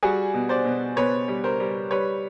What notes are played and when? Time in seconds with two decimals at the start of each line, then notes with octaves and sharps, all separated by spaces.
0.03 G3 F#4 G#4
0.34 B2
0.49 C5 D5
0.65 B2
0.96 B2 B4 C#5
1.28 G3
1.44 A#4 C5
1.60 G3
1.91 G3 B4 C#5